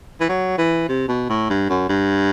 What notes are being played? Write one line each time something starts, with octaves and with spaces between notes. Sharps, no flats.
E3
F#3
E3
C3
B2
A2
G2
F#2
G2